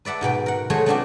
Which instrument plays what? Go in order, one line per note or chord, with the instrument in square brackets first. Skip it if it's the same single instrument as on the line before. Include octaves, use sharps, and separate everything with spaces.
[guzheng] B4 D5 E5 F#5 A5
G#2 B2 B3 G5
A#4 F#5
F#3 G#3 A3 C5 C#5
A3 B3 C4 D4 F4 F#4